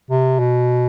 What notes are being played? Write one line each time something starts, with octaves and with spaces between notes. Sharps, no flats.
C3
B2